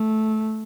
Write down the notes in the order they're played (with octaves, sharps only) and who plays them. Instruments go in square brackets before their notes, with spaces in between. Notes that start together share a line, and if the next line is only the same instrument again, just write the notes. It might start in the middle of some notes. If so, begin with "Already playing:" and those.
Already playing: [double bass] A3